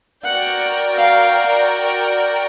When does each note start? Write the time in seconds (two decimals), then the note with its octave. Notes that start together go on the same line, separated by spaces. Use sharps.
0.24 F#4 A#4 D5 F#5 G5
0.96 F5